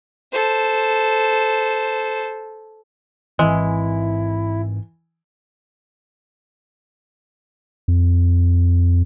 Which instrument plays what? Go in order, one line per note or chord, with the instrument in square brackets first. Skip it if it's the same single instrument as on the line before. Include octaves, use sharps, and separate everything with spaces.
[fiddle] A4 C5
[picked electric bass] G#2 C4 [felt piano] E3 [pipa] G#3 [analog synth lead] E4
[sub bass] F2